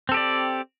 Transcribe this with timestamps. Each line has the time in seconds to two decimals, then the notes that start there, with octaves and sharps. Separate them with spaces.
0.09 C4
0.12 A4
0.14 G4
0.17 D5